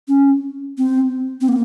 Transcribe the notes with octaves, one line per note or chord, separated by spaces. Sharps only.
C#4
C4
C4
A#3